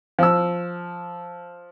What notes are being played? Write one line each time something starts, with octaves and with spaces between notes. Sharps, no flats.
F3 E6